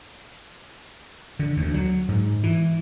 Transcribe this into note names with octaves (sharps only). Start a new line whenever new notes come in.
D3
D2
F#3
G#2
E3